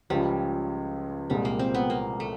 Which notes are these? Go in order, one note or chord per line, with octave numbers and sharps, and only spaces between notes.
C#2 C#3 F3 G3
C2 A#2 F3 G3 G#3
A#3
C4
B3
A#3
A3